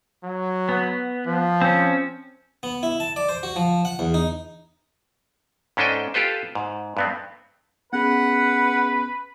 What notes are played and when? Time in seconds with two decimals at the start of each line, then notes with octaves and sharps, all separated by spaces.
0.24 F#3
0.69 B3
1.27 F3
1.61 C4 C#4
2.63 B3
2.83 E4
3.00 A5
3.16 D5
3.29 C5
3.43 F#4
3.56 F3
3.85 F#5
3.99 E2
4.14 D#4
5.77 G#2 C#4 D4 A4 D#5 G5
6.14 F4 G4 A4 B4 C5
6.55 G#2
6.97 G2 B3 C4
7.93 B3 C#4 G#4 B4 F#5